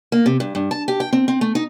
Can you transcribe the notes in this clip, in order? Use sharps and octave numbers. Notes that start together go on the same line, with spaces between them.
A#3
C3
G2
G2
A5
G4
G5
C4
C4
A3
D#4